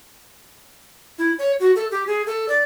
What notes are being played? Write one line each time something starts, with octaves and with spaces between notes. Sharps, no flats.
E4
C#5
F#4
A4
G4
G#4
A4
D5